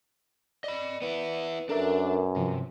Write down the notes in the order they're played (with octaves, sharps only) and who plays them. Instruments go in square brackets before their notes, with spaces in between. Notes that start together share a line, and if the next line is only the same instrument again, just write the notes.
[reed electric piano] D5 [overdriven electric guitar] D#5 B5
[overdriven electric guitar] B3 E4 [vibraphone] B4
[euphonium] F#2 [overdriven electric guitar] D4 [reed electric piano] A4 A#4 E5
[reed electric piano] G2 F3 [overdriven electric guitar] C3